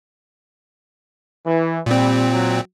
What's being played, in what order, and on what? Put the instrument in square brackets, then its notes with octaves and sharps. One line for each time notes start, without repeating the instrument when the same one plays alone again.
[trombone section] E3
[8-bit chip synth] A#2 C4 [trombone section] G3
[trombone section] F#3